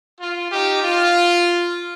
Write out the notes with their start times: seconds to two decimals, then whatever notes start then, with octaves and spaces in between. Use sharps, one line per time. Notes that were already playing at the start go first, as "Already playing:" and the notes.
0.20 F4
0.51 D#4 G4
0.83 F4